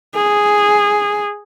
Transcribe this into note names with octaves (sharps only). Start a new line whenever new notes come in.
G#4